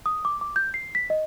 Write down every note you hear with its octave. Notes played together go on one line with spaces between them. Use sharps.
D#6
D6
D6
G6
C7
B6
D#5